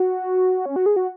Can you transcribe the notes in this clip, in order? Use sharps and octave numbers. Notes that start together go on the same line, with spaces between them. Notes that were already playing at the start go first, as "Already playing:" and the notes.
Already playing: F#4
C#4
F#4
G#4
F#4